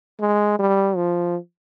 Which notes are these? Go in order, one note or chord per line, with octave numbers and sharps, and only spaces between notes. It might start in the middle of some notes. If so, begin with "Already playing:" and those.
G#3
G3
F3